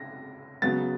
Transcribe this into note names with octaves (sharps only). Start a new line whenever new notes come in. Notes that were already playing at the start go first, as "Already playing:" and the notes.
Already playing: C#4 A#6
C#3 F#3 B3 A6